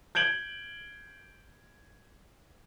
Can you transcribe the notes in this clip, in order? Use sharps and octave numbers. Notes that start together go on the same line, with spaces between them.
G6 G#6 D7 F#7